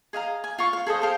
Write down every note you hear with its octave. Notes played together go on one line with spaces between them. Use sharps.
G#4 D#5 F5 A#5
G#5
F4 F5 C#6
F5
G#4 A4 C5 D#5
C5 F5 G5 A5